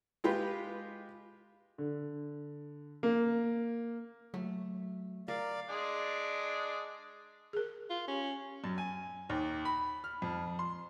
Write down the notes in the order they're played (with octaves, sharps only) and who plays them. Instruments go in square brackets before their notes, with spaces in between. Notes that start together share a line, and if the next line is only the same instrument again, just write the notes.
[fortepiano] G#3 F4 G4 B4
[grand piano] D3
A#3
[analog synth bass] F#3 [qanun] A3
[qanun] A#4 [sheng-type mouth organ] D5 F5
[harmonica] G#3 D4 G#4
[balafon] G#4 A#4
[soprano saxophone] F4
[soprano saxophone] C#4 [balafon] G4
[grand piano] F#2
G#5
D#2
B5
F6
F2
C6